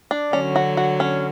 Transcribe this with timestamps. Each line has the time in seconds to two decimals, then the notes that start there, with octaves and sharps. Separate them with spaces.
0.11 D4
0.33 D3 F#3 C#4
0.56 F#4
0.77 F#4
1.00 C#4